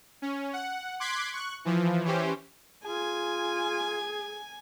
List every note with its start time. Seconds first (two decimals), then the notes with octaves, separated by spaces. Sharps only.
0.22 C#4
0.53 F#5
1.00 C6 D6 F#6 G#6 B6
1.33 C#6 F#6
1.65 E3 F3
2.05 E3 C#4 G4 C5
2.85 F4 G#4 G#5